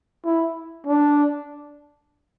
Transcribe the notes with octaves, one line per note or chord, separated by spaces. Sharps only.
E4
D4